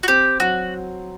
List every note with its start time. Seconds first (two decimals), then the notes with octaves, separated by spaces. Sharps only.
0.03 F#4
0.08 C4 G4
0.40 F#3 F#4